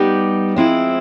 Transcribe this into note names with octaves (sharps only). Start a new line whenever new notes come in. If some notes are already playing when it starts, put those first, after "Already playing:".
Already playing: G3 B3 D#4 G4
F3 G#3 C4 E4